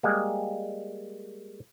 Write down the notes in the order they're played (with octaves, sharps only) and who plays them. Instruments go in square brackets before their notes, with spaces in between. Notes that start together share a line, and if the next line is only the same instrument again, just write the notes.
[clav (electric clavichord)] G3 G#3 A#3